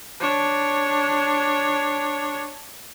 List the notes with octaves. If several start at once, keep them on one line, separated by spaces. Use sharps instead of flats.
D4 C#5